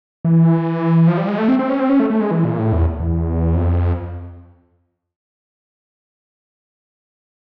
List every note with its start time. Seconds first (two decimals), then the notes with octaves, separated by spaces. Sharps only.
0.25 E3
1.07 F3
1.17 G3
1.28 G#3
1.38 A3
1.48 C4
1.59 C4
1.69 C#4
1.80 C4
1.90 C#4
2.00 A3
2.10 A3
2.20 G#3
2.31 E3
2.44 A#2
2.58 A2
2.73 E2
3.00 E2
3.55 F2